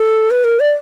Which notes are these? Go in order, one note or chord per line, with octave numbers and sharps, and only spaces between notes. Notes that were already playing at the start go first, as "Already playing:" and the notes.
Already playing: A4
B4
A#4
D5